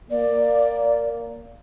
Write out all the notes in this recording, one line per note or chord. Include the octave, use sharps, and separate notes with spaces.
A#3 D5